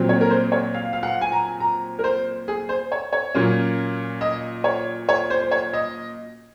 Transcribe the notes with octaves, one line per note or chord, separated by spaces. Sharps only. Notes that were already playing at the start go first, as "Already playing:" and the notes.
Already playing: A#2 F#3 C4
C#5
A#4
C5
C#5
F5
F5
F#5
G#5
A#5
A#5
A#4
C5
G#4
C5
C#5
C#5
A#2 F#3 A#3 C#4
D#5
C#5
C#5
C5
C5
C#5
D#5